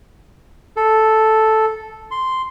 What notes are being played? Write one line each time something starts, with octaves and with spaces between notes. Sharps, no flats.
A4
C6